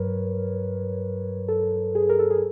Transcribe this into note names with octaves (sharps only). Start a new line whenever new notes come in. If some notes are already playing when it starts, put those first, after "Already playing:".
Already playing: G2 F#3 A#4 B4 C#5
A4
G#4
A#4
A4
G#4